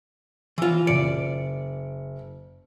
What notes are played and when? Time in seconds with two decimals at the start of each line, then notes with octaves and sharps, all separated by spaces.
0.58 E3 F4
0.87 F#1 D5 C#7